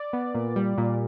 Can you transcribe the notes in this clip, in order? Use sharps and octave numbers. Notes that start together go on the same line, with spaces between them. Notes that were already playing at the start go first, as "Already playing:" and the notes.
Already playing: D5
B3
A#2
G3
A#2